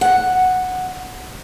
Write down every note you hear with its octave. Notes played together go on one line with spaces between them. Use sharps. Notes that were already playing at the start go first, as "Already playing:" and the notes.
F#5